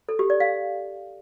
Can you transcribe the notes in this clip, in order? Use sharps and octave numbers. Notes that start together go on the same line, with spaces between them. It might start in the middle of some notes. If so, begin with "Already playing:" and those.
A4
G4
D5
F5